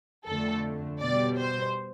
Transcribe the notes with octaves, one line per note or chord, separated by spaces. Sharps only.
F2 D3 A3 A4
B2 G3 D5
C5